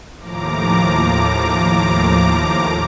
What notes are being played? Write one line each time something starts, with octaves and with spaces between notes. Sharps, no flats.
D#2 A2 F3 A#5 D6